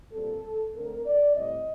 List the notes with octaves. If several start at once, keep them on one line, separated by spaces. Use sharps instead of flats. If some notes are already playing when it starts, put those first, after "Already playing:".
A#2 G3 C4 A4
D3 A3 C4 A#4
D5
A2 G3 C4 D#5